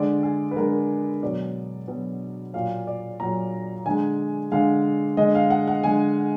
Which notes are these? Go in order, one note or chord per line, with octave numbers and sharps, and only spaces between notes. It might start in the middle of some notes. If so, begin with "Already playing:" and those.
Already playing: D3 G#3 D5
G#4
B4
D3 G#3 A#4
B2 F#3 D5
B2 F#3
A#2 F#3 F5
D5
A#2 F#3 A#5
D3 G#3 G#5
D3 G#3 F5
D3 G#3 D#5
F5
F#5
F#5
D3 G#3 G#5